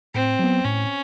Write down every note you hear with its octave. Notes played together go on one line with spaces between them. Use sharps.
A2 C4
F#3 B3
A2 C#4